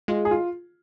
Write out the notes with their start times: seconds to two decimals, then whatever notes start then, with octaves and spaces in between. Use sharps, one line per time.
0.08 G#3 F4
0.25 G#4
0.31 F4